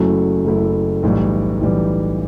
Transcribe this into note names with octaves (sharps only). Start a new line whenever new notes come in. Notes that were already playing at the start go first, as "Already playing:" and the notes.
Already playing: F#1 F#2 F#3 A3 E4
F#1 F#2 F#3 A3 E4
B1 A2 E3 G3
B1 A2 E3 G3